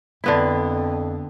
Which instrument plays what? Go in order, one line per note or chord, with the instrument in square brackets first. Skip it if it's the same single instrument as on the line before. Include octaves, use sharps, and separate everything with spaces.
[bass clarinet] F2 [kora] D3 B3 E4